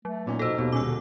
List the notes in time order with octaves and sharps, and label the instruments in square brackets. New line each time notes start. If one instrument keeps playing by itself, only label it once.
[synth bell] F#3 [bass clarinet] A3
[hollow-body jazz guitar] A#2 [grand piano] B3 C#4 D#4
[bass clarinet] B2 [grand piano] D#4 E6 A#6 [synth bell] A4 C5
[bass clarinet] D#2 [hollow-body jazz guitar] B2
[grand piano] D#1 G#3 [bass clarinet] C#4 [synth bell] D6 E6
[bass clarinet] D3